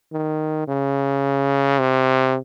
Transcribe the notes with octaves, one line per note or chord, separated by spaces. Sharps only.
D#3
C#3
C3